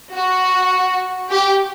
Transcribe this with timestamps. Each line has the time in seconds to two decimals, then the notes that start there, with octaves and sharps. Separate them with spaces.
0.16 F#4
1.30 G4